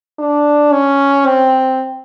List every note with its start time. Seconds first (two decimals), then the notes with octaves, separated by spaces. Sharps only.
0.19 D4
0.73 C#4
1.26 C4